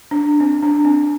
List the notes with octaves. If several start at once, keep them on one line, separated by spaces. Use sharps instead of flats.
D4
C4
D4
C4